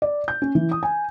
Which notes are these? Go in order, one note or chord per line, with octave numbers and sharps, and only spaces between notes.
D5
G6
C#4
E3
D#6
G#5